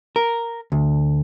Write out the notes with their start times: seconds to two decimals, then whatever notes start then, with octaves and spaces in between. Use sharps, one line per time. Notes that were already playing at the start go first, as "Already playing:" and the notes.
0.16 A#4
0.72 D2